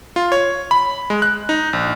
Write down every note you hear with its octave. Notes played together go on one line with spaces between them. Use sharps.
F4
C#5
B5
G#3
F#6
D#4
A#1